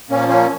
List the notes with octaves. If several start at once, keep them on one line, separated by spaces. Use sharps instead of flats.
A#2 F3 A#3 C#4
A#3 C#4